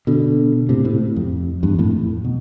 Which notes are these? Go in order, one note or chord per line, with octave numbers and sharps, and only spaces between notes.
B2 D3
A2 C3
A2 C3
F2
E2 G2
F2 A2
B2